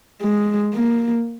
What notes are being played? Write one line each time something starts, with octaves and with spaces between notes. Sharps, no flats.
G#3
A#3